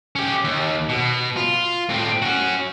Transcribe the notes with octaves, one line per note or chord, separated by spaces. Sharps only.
C#4 G4
D#2
B2
F4
A2 C4
C#4 F#4